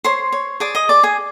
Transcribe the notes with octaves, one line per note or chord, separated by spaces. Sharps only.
C5 C#5 C6
C#5
G#4 D5 D6
D#5 D#6
G#4 D5 D6
G#4 G#5